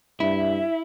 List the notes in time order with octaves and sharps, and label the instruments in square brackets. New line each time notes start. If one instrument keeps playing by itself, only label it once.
[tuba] G2 [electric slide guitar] E4 [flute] E5